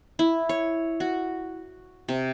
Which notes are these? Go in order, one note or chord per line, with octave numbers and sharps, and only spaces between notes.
E4
C#5
F#4
C3